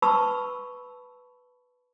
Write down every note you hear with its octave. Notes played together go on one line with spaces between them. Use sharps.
B4 A5 B5 C#6 E6